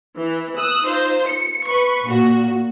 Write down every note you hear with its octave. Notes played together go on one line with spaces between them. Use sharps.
E3
D#6 E6 F#6
D#4 F4 C5
C#7
B4 C#6
A#2 F#4